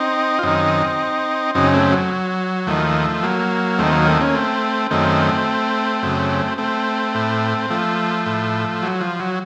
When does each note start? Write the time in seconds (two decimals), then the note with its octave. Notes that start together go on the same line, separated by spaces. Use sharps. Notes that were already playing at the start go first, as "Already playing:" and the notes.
Already playing: C4 D#4
0.39 F4
0.43 F#2 D#3 C4 D#4
1.55 F#2 C#3 C4 D#4
1.74 A3 C4
1.92 F#3
2.67 D#2 D#3 F3 A3
3.23 F#3 A#3
3.78 D#2 D#3 A3 C4
3.92 F#3 A#3
4.07 A3 C4
4.20 A#3 C#4
4.35 A3 C4
4.91 F#2 D#3 A3 C4
6.03 F#2 C#3
6.58 A3 C4
7.15 A2
7.70 F3 A3
8.26 A2
8.82 F#3
9.00 F3
9.20 F#3